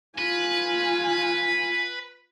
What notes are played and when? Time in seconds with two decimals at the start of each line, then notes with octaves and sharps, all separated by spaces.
0.18 F4 B4 G#5